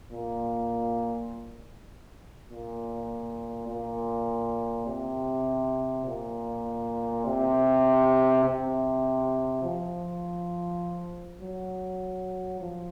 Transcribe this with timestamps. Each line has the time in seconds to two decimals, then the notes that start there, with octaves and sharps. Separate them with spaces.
0.12 A#2
2.50 A#2
3.68 A#2
4.87 C3
6.06 A#2
7.26 C3
8.44 C3
9.63 F3
11.41 F#3
12.61 F3